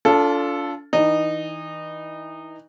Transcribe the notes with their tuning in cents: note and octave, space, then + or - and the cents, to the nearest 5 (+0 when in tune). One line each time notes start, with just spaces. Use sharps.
D4 -40 F4 +0 A4 +0
E3 -35 D#4 -20